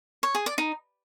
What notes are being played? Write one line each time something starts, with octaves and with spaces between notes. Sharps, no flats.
C#5
G#4
D5
D#4